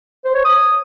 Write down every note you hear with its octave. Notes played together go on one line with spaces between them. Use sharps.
C5
C#5
D#6